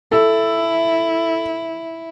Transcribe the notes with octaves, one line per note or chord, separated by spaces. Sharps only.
E4 A4